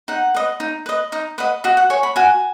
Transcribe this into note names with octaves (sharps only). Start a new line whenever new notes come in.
D#4 F#5
B4 D#5
D#4
B4 D#5
D#4 D#5
B4 D#5 F#5
F#4 D#5
F#5
C#5 G#5
B5
F#4 G#5